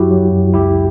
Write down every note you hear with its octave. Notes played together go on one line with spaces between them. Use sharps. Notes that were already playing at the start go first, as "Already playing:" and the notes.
Already playing: F#2 F#3 E4 F#4 G4
F#3
F#2
C#2 E4 G4